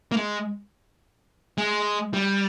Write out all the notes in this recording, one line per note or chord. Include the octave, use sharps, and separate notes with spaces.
A#3
G#3
G#3
G3